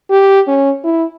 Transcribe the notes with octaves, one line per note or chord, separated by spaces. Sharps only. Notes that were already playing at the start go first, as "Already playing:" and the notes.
G4
C#4
E4